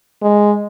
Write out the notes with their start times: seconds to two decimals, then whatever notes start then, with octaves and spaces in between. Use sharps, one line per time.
0.22 G#3